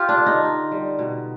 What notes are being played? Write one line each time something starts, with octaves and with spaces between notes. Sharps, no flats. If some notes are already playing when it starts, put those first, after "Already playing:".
Already playing: F4 G4
D4
D3
D#4
D3
G3
B2